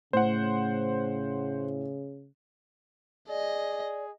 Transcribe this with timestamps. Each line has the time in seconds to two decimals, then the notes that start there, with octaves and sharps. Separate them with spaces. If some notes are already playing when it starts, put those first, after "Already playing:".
0.13 A2 C#3 C5 F#5
3.29 G#4 D5 D#5